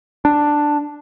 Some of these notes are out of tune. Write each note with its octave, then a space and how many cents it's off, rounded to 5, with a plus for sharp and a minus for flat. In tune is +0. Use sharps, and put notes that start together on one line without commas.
D4 +5